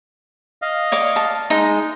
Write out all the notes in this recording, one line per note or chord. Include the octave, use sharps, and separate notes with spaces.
D#5 F5
C#5 D5 D6
A5
G#3 D#4